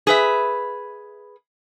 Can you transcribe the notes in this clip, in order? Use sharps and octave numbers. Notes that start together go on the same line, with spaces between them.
G#4 B4 E5